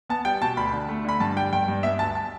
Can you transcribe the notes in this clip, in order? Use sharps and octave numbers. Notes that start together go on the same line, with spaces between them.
B3 A5
G3 G5
B2 A5
D2 B5
D3
A3
D3 B5
G2 A5
G3 G5
G2 G5
G2
B3 E5
D2 A5
A5